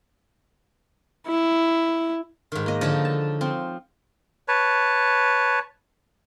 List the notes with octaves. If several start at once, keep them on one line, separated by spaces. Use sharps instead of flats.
E4
G#2 D#3
A#3 D#5
D3 F3 D#4 A4 C#5
A5
F3 C4
B4 C#5 A5